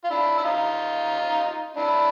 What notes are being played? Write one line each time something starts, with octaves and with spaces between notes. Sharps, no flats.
F4
D4 E4
E4
D#4 F4
D4 E4